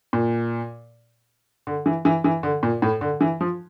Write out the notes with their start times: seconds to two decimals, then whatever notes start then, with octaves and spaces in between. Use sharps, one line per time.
0.13 A#2
1.67 D3
1.86 E3
2.05 E3
2.24 E3
2.43 D3
2.63 A#2
2.82 A2
3.01 D3
3.21 E3
3.41 F3